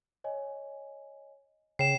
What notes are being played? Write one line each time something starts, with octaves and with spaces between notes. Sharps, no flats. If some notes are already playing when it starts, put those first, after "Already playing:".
C#5 D#5 G#5
C#3 G5 C7 E7